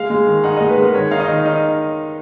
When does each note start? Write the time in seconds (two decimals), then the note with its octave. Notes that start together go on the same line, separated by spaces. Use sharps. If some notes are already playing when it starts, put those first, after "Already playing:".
Already playing: G#3 F5
0.10 G#3
0.27 D#3
0.44 D#4 F#5
0.56 D#5
0.61 G#3
0.69 B4
0.78 G#3 A#4
0.95 D#3 C#5
1.11 D#4 F5
1.20 D#5
1.28 D#3
1.45 D#4 D#5